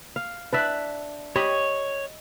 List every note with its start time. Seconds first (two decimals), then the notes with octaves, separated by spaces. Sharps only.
0.16 F5
0.53 D4 B4 D5 E5
1.36 G4 C#5 D#5 B5